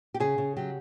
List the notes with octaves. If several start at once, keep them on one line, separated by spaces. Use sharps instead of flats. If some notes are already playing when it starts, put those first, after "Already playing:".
G4
C#3 G#4
C#3
F#3 G4